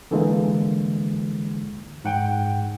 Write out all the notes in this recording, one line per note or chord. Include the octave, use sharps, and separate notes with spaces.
D3 E3 G#3 A#3
G#2 F#5 G5